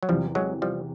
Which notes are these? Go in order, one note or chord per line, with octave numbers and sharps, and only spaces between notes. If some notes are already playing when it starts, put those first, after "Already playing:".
F#3
E2 C3 E3 F3 G3
F#3 G#3
F3 G3